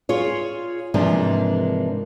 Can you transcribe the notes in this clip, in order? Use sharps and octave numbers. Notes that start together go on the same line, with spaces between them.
F4 G#4 C#5
G#2 C3 E3 F3 A#3 D4